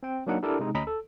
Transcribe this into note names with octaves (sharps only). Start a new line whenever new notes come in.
C4 G5
F#3 A#3 D4 D#4 F#5
D4 E4 G4 A4 A#4 D5
C3 G#3 D#4
D2 C#4 D#5 A#5 B5 B6
A4